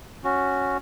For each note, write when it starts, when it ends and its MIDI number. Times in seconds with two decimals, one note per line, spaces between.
0.24 0.77 61
0.24 0.77 66